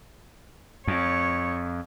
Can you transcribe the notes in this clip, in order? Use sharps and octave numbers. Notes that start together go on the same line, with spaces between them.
F2 C#5